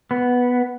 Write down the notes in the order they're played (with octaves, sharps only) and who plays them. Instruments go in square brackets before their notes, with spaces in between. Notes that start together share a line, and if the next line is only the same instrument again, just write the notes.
[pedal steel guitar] B3